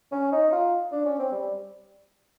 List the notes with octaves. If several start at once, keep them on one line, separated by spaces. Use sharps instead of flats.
C#4
D#4
F4
D4
C#4
C4
G3